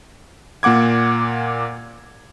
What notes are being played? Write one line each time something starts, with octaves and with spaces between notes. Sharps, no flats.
A#2 A#3 F#5 D6 G#6